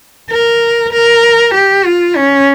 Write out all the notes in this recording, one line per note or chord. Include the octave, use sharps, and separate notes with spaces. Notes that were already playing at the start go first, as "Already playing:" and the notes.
A#4
A#4
G4
F4
C#4